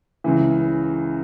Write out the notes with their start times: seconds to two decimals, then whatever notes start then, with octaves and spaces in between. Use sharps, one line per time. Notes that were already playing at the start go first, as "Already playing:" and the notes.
0.24 C#2 C#3 E3